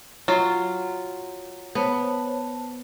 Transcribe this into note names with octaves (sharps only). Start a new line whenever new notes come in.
F#3 F4
B3 C5 C#5 A5